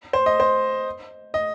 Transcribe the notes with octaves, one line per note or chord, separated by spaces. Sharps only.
C5
D#5
C5
D#5